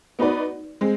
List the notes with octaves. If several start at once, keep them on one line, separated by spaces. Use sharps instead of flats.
B3 D#4 F#4 B4 D5
G#3 C4